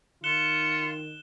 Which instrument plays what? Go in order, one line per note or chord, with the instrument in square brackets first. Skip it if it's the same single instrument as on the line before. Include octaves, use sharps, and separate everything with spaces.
[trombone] D#3 [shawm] F4 [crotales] F#6 E7 G7 [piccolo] C#7